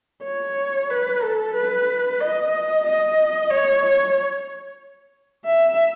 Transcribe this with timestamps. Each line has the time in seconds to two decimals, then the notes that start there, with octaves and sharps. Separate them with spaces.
0.24 C#5
0.90 B4
1.22 A4
1.55 B4
2.20 D#5
2.84 D#5
3.50 C#5
5.45 E5